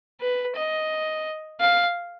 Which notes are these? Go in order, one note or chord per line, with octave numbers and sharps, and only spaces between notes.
B4
D#5
F5